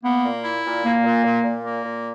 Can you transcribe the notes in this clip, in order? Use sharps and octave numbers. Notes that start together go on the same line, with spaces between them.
A#3 B3
A#2
E4
A#2
A#2 A#3
A#2
A#2
A#2
A#3
A#2